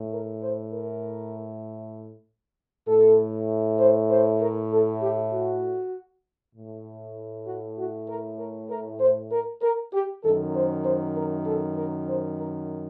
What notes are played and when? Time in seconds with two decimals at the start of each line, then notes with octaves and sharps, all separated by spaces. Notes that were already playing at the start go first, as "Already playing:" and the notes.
Already playing: A2
0.12 A#4
0.43 C5
0.73 A#4
2.88 A2 A4
3.79 C5
4.10 C5
4.41 A#4
4.72 A4
5.02 G4
5.32 F#4
6.55 A2
7.47 F#4
7.79 F#4
8.09 A#4
8.39 A#4
8.70 A#4
9.00 C5
9.32 A#4
9.62 A#4
9.93 G4
10.23 F#2 D#3 A4
10.54 C5
10.84 C5
11.15 A#4
11.46 A4
11.77 A#4
12.07 C5
12.39 A#4